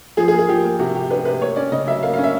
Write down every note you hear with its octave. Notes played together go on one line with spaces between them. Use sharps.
F3 G#4
G#4
A#3
G#4
F3 G4
A#3
C3 F#4
C3 G4
D4 B4
C3 B4
A#3 C#5
C#4 D5
C#3 D#5
F#3 E5
A#3 F5
F5
C#4
E5